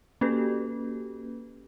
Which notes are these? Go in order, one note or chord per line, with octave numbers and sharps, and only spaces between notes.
A#3 C#4 F#4 G4 A4 B4